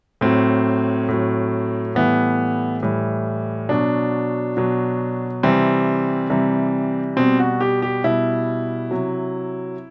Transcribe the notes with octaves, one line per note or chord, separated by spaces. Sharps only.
A2 F#3 C4
A2 F#3
A2 E3 G3 B3
A2 E3 G3
B2 F#3 D4
B2 F#3
C3 E3 G3 C4
C3 E3 G3
B2 G3 C4
F#4
G4
G4
B2 G3 E4
C3 F#3